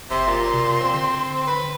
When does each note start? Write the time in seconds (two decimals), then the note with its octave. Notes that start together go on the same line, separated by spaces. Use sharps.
0.11 F#1 C3 C6
0.27 A#2
0.54 C3
0.81 C4
0.94 D3
1.47 B4